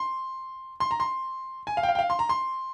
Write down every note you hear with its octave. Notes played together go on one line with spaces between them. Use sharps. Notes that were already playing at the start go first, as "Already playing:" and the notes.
Already playing: C6
C6
A#5
C6
G#5
F5
G5
F5
G5
F5
C6
A#5
C6